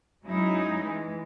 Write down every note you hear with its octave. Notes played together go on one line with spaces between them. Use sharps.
F#3 G#3 C#4 D#4 E4
E3 G#3